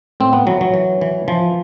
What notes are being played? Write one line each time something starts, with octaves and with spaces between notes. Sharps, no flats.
A2 C4
B3
E3 F#3
F#3
E3
E3
E3 F3